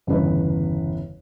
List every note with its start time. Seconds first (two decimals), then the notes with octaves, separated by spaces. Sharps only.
0.07 G1 E2 C#3 B4